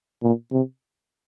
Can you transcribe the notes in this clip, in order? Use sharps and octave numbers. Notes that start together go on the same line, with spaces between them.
A#2
C3